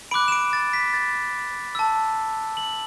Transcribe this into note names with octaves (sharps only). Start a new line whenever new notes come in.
B5 D6 F#6 D7
E7
D7
A6
B6
A6
A5 E6
F#7